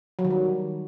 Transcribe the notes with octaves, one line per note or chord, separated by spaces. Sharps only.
F#3
D#3
G3